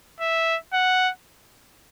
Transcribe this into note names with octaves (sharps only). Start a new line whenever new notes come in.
E5
F#5